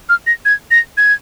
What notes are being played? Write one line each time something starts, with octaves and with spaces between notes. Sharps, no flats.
F6
A#6
G#6
A#6
G#6